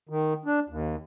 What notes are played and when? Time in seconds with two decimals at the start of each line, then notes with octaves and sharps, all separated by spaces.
0.09 D#3
0.46 D4
0.69 D#2